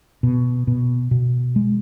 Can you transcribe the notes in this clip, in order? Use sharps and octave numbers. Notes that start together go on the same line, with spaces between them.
B2
B2
B2
G#3